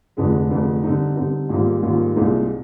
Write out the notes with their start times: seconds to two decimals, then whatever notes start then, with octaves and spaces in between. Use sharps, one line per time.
0.17 F1 F2 D3 G#3
0.50 F1 F2 D3 G#3
0.83 D3 G3 C4 D#4
1.16 D3 G3 C4 D#4
1.49 A#1 G#2 D#3 G3 A#3
1.82 A#1 G#2 D#3 G3 A#3
2.16 C2 A#2 G#3 C4 D#4